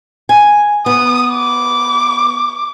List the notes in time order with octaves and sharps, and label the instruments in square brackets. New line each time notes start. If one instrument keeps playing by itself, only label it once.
[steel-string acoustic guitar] G#5
[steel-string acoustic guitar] B3 [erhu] D#6
[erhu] D6